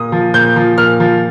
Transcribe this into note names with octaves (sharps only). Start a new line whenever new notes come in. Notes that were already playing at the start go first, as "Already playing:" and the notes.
Already playing: A#2 D#6
F3
A#2 G6
F3
A#2 F6
F3